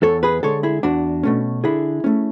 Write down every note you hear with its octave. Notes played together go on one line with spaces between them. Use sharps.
E2 A4 C#5
G#4 B4
D3 G#3 A4 C#5
E4 G#4
E2 D4 F#4
B2 A3 C#4
D3 E4 G#4
A3 C#4